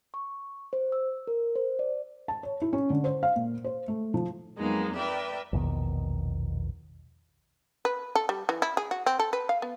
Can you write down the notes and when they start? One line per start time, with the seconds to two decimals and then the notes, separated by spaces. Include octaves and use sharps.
0.14 C#6
0.73 C5
0.92 E6
1.27 A#4
1.55 C5
1.79 D5
2.28 A5
2.43 C#5
2.62 E4
2.73 C#4
2.90 D3
3.04 C5
3.23 F5
3.36 A#2
3.64 C5
3.88 A3
4.14 F3
4.58 F2 F#3 G#3 A#3 B3 D#4
4.95 A#4 B4 D5 E5 G5
5.52 A#1 E2 B2 D#3
7.85 B4
8.15 A4
8.29 G3
8.49 E3
8.62 E4
8.77 G#4
8.91 F#4
9.06 C4
9.19 A4
9.33 B4
9.49 F5
9.62 B3